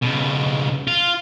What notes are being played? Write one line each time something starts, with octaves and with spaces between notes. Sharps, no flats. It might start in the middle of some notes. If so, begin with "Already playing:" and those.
C#2 B2
F4